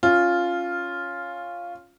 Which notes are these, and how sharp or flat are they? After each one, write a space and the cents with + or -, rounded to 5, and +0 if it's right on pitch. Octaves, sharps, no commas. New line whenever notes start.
C#4 +0 F4 +0